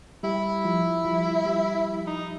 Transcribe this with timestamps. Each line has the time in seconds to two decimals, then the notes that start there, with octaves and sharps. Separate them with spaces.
0.23 G3 E4 G4
0.64 F3 F4
1.05 F3 F4
1.45 G3 G4
2.07 D#4